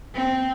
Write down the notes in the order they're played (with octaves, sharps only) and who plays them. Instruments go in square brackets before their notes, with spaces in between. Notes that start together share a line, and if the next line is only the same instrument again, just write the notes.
[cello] C4